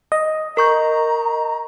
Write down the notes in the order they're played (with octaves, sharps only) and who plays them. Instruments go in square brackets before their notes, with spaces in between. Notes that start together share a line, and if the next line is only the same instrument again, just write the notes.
[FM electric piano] D#5
[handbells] A#4 C#6 G6 [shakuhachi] A#5